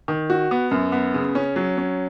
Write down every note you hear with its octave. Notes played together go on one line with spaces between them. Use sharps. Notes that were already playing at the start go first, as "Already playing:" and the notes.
D#3
F#4
B3
F#2
B3
C#3
C#4
F#3
C#4